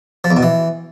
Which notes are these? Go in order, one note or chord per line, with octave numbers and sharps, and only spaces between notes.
F3
E2
B2
E3